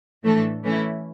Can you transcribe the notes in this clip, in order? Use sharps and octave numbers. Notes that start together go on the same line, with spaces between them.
A2 E3 A3 D4 A4
E3 A3 C#4 E4